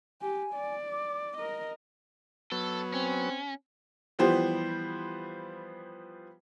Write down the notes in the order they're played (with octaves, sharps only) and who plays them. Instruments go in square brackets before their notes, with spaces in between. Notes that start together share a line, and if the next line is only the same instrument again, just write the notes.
[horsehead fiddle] G4 [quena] G#5
[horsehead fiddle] D5
[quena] D6
[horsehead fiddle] A#4 D#5
[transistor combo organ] F#3 B3 [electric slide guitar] A4
[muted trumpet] C4 [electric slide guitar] C#4
[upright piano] E3 F3 G3 B3 G4 C5